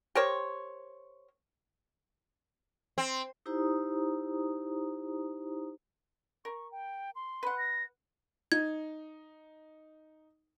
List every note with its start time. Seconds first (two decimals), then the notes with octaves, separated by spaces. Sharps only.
0.15 G4 A#4 C5 C#5
2.98 C4
3.46 D#4 E4 G4 C5 A#5 D#6
6.45 A#4 C#6
6.72 G5
7.15 C6
7.43 B4 F#5
7.58 A#6
8.52 D#4 G#6